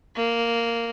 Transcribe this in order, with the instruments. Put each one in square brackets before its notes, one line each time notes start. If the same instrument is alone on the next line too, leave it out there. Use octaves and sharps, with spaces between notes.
[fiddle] A#3